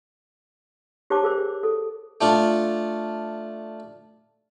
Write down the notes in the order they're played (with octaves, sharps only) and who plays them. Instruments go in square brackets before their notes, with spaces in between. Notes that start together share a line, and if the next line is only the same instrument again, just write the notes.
[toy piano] G4 C5 C#5 A5 D6
G#4 A#4 C5
A4
[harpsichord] A3 D4 F4